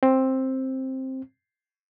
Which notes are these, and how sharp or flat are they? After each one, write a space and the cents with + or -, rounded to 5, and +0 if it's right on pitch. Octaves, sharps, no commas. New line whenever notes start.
C4 +10